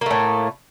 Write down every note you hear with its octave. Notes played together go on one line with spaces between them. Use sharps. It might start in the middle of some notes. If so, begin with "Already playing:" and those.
A2 A3 A#3